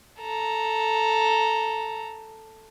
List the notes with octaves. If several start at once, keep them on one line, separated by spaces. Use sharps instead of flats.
A4 A#5